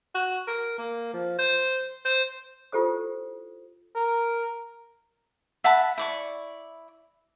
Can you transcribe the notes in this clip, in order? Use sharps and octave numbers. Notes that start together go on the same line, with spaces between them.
F#4
A#4
A#3
F3
C5
C5
E4 F4 G4 A4 C5 D#6
A#4
E5 F#5 A5 B5
E4 D5 C#6